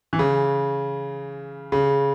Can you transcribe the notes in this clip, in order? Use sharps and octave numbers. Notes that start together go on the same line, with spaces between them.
E3
C#3
C#3